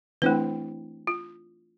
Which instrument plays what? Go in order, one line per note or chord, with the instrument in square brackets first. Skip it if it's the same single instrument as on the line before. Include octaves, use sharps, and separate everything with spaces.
[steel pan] E3 C4 E4 [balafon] A3 D4 B4
[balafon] F4